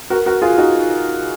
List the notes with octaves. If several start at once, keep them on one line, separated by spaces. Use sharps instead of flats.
F#4 A#4
F#4 A#4
F4 G#4
D#4 F#4